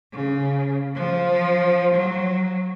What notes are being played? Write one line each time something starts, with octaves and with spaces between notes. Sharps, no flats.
C#3
F3
F#3